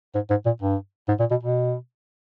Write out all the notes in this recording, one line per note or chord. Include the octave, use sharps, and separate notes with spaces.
G#2
G#2
A#2
G2
G#2
A#2
B2
B2